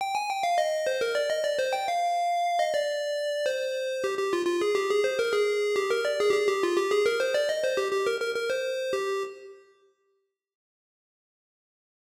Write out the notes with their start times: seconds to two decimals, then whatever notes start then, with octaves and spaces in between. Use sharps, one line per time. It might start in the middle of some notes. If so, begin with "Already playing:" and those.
0.01 G5
0.15 G#5
0.29 G5
0.43 F5
0.58 D#5
0.87 C5
1.01 A#4
1.15 D5
1.30 D#5
1.44 D5
1.59 C5
1.73 G5
1.88 F5
2.59 D#5
2.74 D5
3.46 C5
4.04 G4
4.18 G4
4.33 F4
4.46 F4
4.61 G#4
4.75 G4
4.90 G#4
5.04 C5
5.19 A#4
5.33 G#4
5.76 G4
5.90 A#4
6.05 D5
6.20 G#4
6.30 G4
6.34 G#4
6.48 G4
6.63 F4
6.77 G4
6.91 G#4
7.06 A#4
7.20 C5
7.34 D5
7.49 D#5
7.64 C5
7.77 G4
7.92 G4
8.07 A#4
8.21 A#4
8.35 A#4
8.50 C5
8.93 G4